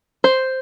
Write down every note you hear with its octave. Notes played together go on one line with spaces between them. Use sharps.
C5